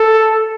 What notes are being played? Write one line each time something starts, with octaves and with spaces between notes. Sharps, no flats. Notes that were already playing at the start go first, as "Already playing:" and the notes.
Already playing: A4